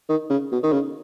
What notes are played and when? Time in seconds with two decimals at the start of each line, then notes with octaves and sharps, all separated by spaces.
0.09 D#3
0.30 C#3
0.52 B2
0.63 D#3
0.73 C#3